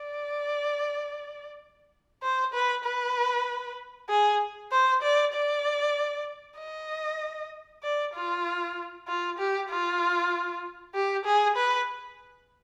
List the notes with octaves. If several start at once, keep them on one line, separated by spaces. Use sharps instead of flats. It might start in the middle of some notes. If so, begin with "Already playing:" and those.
Already playing: D5
C5
B4
B4
G#4
C5
D5
D5
D#5
D5
F4
F4
G4
F4
G4
G#4
B4